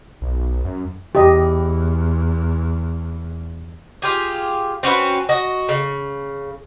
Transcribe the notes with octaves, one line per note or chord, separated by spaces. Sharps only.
B1
F#2
E2 G4 D#5
F4 G4 G#4
C4 C#4 F#4 B4
F#4 D#5
C#3